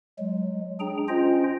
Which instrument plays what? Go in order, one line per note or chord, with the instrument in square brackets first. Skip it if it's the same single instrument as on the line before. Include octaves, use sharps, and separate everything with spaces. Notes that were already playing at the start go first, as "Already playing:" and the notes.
[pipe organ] F#3 G#3
D4 G#4 G5 A#5
C#4 F4 C5 D#5 G5